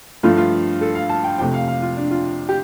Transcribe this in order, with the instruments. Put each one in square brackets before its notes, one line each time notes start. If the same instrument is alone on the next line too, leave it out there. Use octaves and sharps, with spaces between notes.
[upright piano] G2 F3 A3 F4
F4
A4
F5
A5
G5
F2 C3 A3 G5
F5
F5
F4
D4
F4
G4